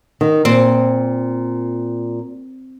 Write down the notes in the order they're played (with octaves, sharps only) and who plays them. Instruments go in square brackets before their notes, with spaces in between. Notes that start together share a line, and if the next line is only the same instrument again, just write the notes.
[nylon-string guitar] D#3
[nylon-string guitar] A#2 [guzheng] C4